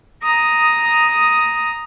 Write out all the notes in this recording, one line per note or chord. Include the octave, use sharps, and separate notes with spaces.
A#5 D#6